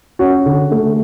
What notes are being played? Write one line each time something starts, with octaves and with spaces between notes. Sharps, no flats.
C#4 F#4
D3
A3